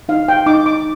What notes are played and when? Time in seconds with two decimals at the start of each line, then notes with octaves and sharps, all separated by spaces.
0.09 D#4 F5
0.28 G5
0.46 D#4 D6
0.66 D6